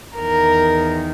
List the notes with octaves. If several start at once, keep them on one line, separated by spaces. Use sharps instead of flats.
E2 D#3 A#4